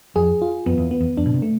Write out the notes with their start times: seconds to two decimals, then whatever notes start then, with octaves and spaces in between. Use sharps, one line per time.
0.15 F2 G#4
0.42 F4
0.66 F2 B3
0.78 E2
0.91 B3
1.00 E2
1.17 F2 D4
1.26 B2
1.34 C3
1.42 A3